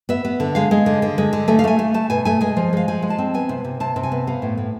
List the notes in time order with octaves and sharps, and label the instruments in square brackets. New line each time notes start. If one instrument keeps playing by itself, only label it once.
[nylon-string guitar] B3 E5
B3
D3
G#3 F5
G#3
D3
D3
G#3
D3
A3 G#5
F5
A3 G#5
A3
A3 A5
B2 G#5
A3 G#5
G#3 G#5
F3
G#3 F5
F3 G#5
G#3
A5
C4
B3 G#5
C3
C3
C3 A5
C3
G#5
B3
B3 F5
A2
A2